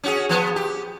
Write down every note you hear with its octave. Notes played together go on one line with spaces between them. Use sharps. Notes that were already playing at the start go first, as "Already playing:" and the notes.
C#4 F#4 G#4
F3 B3
G4